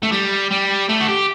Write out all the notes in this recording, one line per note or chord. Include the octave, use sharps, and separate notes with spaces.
A3
G3
G3
A3
F#4
G4